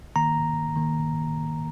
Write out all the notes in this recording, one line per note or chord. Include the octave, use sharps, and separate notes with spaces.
D#3 A#3 A#5
D#3 A#3